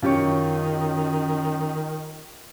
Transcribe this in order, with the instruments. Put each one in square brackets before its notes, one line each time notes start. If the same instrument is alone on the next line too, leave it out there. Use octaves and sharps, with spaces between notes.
[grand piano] F#2 [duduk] D#3 [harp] F4 G4 C#5